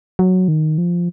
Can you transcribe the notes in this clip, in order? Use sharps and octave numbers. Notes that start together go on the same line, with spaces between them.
F#3
D#3
F3